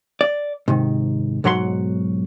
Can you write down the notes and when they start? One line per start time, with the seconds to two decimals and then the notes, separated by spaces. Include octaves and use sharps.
0.21 D5
0.68 G#2 C3 D#3
1.44 B1 G#2 F#3 F#5 B5 C6